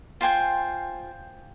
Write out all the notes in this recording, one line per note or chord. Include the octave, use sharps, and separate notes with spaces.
F4 C5 G5 G#5